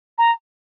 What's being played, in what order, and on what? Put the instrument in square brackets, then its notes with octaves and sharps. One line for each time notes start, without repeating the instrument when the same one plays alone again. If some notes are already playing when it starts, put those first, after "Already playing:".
[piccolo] A#5